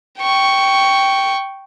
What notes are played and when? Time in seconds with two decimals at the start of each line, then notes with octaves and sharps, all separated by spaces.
0.20 G5 C#6